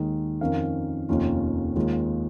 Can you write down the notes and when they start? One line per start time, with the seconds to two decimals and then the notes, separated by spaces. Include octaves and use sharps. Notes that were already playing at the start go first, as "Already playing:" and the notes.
Already playing: D#2 D#3 G#3
0.41 F2 D#3 C#4 A#4 F5
1.09 F1 D#2 D#3 C#4 F4
1.75 D#2 D#3 G#3 F4